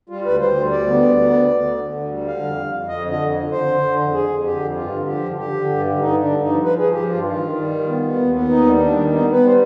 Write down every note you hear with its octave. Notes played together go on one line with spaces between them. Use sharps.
G3 F4
D2 B4
D2 C5
G3
D2 D5
B3
D2
B3
D2
D2
D3
D3
D2
G3
D3 F5
F2
F2
F2
F2 D#5
D3
D#5
F2
D3
D3 C5
D3
D3
F2
F2 G#4
F2
D3 G4
F2
G2 F4
D3
F3 G4
D3
D3 G4
D3
G2
D3
G2 D#4
D3
D4
G2
F3 D#4
F3 B4
F3 G#4
F3 G4
G2 F4
D#3 F4
D#3
G3
D#3
B3
B3
D#2
B3
D#2 D#4
G3
D#3 D4
G3
B3 D#4
B3
B4
G3 C5